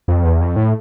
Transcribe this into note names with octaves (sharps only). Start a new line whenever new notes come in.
F2
E2
F2
A2